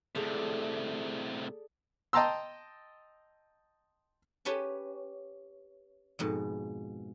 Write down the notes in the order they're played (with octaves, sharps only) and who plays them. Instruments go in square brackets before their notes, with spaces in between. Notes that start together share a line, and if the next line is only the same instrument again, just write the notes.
[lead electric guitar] A2 C3 [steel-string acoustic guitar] G#4 A4 D5
[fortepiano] D#5 G5 A5 A#5 C6 E6
[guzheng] C#4 G4 B4 C#5 A5
F2 G#2 B2